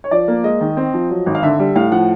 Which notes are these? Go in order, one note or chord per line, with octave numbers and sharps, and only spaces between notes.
C#5
F3 D5
A#3
G#3 D#5
D#3
C4
F3
F#3
G#1
F5
D3 E5
G3
A2 F5
F3 F#5